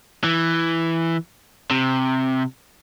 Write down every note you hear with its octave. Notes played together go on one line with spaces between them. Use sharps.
E3
C3